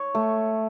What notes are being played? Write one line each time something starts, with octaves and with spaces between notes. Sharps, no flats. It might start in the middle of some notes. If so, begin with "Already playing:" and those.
Already playing: C#5
A3